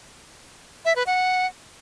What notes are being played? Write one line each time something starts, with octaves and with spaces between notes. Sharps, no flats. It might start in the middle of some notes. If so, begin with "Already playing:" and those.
E5
B4
F#5